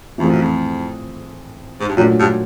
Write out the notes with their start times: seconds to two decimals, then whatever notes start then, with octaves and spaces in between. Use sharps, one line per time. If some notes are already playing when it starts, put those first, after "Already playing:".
0.18 F2 E3 A3 C4 F4 G#4
0.29 F#2
0.41 F2
1.80 G#2
1.89 G2
1.97 F#2 A#2 F#3 A3 D4
2.19 G2